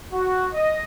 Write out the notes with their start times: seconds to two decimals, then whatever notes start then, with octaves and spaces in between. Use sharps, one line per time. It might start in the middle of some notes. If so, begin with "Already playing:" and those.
0.13 F#4
0.52 D#5